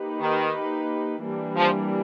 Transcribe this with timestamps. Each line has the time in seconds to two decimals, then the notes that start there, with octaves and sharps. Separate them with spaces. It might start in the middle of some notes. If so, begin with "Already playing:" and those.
Already playing: A#3 D#4 G4 B4
0.20 D#3
1.23 E3 G3 A#3 D4
1.56 F3